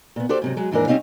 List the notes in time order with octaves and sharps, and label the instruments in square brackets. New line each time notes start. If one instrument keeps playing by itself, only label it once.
[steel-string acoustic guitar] A#2 B3
F#4 G4 A4 C5 D5
G#2 C3 F#3
F#3 G#3
D#2 G#2 E3 D4 A#4
G3 C4 C#4 D#4 F5